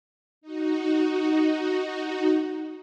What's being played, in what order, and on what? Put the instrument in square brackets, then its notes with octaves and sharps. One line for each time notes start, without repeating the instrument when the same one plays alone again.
[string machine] D#4 F#4